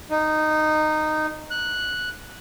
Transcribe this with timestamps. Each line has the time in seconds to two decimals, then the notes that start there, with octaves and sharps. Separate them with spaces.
0.10 D#4
1.51 F#6